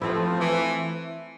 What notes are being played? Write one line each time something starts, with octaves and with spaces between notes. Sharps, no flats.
F3 A3 C4 E4
E3